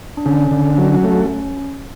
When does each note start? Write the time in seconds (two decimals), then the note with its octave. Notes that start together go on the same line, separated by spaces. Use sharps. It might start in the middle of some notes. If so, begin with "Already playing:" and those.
0.17 D4
0.26 D3 C#4
0.51 D3
0.78 F#3
1.04 A3